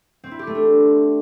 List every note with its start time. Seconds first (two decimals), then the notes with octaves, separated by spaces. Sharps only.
0.24 C4
0.31 E4
0.39 G4
0.47 A3
0.55 D4